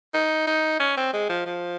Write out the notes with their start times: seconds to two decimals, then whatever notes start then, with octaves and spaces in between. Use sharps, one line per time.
0.14 D#4
0.47 D#4
0.79 C#4
0.97 C4
1.13 G#3
1.29 F3
1.46 F3